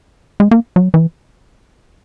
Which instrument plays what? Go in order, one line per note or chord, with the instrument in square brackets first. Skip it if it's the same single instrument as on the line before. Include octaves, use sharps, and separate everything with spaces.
[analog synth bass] G#3
A#3
F#3
E3